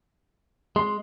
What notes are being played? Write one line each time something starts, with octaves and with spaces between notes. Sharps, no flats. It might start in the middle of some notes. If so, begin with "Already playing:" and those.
G#3 C6